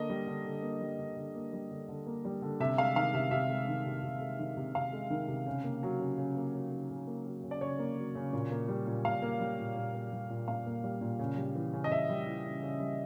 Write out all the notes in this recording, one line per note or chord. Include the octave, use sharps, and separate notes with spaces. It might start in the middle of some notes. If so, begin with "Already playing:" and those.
Already playing: D3 A#3 D#5
G3
D3
D3
A#3
G3
D3
D3
A#3
G3
D3
D3
A#3
G3
D3
C3 E5
G#3 F5
D#3 F5
C3 E5
C3 E5
G#3
D#3
C3
C3
G#3
D#3
C3
C3 F5
G#3
D#3
C3
C#3
A#3
F#3
C#3
C#3
A#3
F#3
C#3
C#3
A#3
F#3
C#3
D5
C#3 C#5
A#3
F#3
C#3
A#2
A#3
G3
A#2
A#2 F5
A#3
G3
A#2
A#2
A#3
G3
A#2
A#2 F5
A#3
G3
A#2
C#3
G3
E3
C#3
D#5
C#3 E5
G3
E3
C#3
C#3
G3